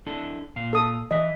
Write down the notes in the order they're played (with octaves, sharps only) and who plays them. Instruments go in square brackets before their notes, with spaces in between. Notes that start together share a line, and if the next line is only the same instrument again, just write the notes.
[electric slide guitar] D4 E4 A4
A#2 F5
[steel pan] A4 D#6
[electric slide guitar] E3 E5 [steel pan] D#5